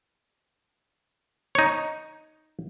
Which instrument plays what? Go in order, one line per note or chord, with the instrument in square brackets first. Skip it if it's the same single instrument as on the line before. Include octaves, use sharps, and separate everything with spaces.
[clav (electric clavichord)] D#4 C#5